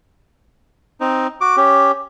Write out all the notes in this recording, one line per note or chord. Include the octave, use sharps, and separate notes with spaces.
C4 D#4
F#4 D6
C#4 G4